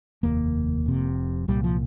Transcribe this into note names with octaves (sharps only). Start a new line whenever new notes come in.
F1 D#2 A#3
F1 F2 C3
C2 A#2 G3
F3